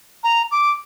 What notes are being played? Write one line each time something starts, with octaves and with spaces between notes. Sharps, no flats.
A#5
D6